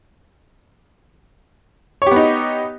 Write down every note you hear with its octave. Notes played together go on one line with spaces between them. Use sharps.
B3 D#4 G4 C#5